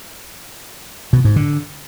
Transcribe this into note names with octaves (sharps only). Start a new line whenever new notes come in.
B2
G#2
D3